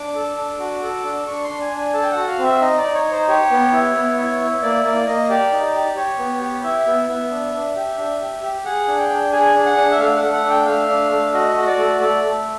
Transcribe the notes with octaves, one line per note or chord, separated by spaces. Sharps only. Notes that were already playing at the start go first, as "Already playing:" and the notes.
Already playing: D4 D6
A4
D4
F#4
A4
D4
D4 C#6
C6
D4
G#5
D4
G#5
A4 A5
G5
F#5
F#4
F5
C4
E5
D#4 D#5
D5
D#4
C#5
D#4
C5
G4 C#5
B3
E4
B3
E4
E4
A#3 D5
A#3 D5
A#3 D#5
G4 D5
D#4
G4
G4 C#5
B3
G4
E4 E5
B3
B3
D4
D4
G4
D4
G4
G4
G#4 F#5
D4
G5
D4
G#4 G#5
D4
F#5
D4
E5
A3 F5
F#5
A3
F#5
D4
G5
A3 F5
D4
A3
F#4 D#5
F#4
D5
A3
A3 D5
A3